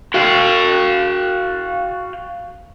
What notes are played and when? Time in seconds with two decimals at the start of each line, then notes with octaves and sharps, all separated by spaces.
0.14 F#4 F5 G5